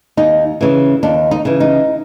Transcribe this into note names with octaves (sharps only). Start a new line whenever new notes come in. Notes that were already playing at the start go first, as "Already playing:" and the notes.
D#2 D#4
C#3 E3
D#2 D4
D#4
C#3 E3
D#4